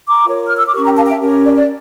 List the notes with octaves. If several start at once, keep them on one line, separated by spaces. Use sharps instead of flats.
A#5 D6
F4 A#4 C#5
F6
E6
D6
C#4 G4 A#4 C#6
G5 A#5
F5 A5
E5 G5
C#4 G4 A#4
D5
D5